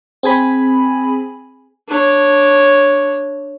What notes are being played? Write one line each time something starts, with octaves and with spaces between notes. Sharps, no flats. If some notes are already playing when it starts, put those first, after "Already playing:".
C4 G#4 G#5 B5
D4 C#5